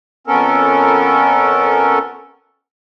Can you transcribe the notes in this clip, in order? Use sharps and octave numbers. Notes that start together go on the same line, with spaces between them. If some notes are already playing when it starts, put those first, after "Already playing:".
F2 B3 C#4 A4 A#4